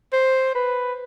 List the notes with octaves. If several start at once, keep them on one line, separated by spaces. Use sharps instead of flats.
C5
B4